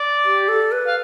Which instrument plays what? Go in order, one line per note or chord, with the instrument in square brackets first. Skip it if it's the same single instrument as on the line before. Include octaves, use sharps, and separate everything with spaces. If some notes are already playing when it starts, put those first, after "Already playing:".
Already playing: [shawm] D5
[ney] G4
A4
B4
[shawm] F5